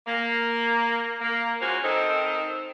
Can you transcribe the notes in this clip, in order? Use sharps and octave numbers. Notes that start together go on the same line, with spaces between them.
A#3
A#3
G#3 C#4 F4 F#4 C5
D#3 C4 D#4 A4 C5